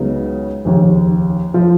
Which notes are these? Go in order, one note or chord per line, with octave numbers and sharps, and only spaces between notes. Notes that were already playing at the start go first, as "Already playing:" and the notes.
Already playing: C#2 C#3 F#3 B3 D#4
F1 D#2 C#3
F3